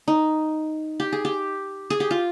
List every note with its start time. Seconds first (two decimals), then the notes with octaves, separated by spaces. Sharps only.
0.08 D#4
1.00 G4
1.13 G#4
1.25 G4
1.90 G#4
2.00 G4
2.11 F4